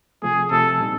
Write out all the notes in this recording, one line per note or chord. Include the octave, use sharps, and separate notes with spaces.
C3 F3 A3 G#4
C3 F3 A3 A4
A#2 G3 C4 D#4